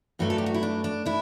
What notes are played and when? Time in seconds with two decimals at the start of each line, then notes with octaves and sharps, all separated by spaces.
0.19 G2 F#3 A3 D4 F#4
0.30 A4
0.38 G4
0.46 F#4
0.54 E4
0.63 D4
0.84 D4
1.06 D4 E4